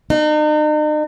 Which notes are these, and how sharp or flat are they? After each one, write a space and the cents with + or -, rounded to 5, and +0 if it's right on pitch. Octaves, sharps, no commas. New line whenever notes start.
D#4 -40